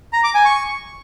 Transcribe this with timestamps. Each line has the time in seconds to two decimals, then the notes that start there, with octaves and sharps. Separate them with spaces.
0.13 A#5
0.24 D6
0.34 G#5
0.45 C#6